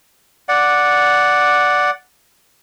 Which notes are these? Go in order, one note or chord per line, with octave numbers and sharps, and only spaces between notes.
D5 F#5